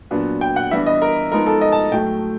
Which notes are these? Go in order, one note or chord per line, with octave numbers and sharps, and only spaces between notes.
A#2 F#3 B3 D4
G5
F#5
E3 G3 B3 D4 E5
D#5
A#4
F3 G#3 B3 D#4 A#4
A4
D#5
A5
A2 F#3 A3 G5